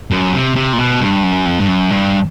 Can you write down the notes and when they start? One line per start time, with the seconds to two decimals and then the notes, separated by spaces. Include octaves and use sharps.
0.11 F#2
0.33 C3
0.56 C3
0.73 A#2
0.79 B2
1.00 G2
1.23 F#2
1.46 F2
1.60 G2
1.68 F#2
1.91 G2